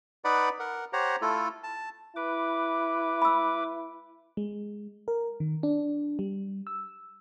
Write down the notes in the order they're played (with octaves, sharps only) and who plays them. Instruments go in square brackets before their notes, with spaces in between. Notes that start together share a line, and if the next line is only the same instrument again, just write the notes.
[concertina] D#4 B4 D5 F#5 B5
A#4 F#5
G4 C5 C#5 F#5 A#5
A3 E4 F4 A4
A5
[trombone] E4 [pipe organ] B4 D6
[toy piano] B5 E6
[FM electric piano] G#3
A#4
D#3
D4
G3
E6